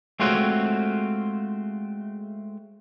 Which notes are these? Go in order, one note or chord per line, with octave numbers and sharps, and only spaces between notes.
G#3 A3 C4 F4 F#4 C#5